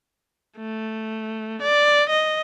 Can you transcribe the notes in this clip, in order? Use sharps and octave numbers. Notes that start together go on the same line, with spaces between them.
A3
D5
D#5